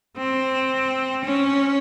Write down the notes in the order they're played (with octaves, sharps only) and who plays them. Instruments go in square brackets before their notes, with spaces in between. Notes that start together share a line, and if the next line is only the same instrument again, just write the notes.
[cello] C4
C#4